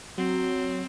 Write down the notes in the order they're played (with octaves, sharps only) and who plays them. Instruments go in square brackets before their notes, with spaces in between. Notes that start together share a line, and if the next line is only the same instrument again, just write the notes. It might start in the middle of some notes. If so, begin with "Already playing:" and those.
[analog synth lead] F#3 [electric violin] C4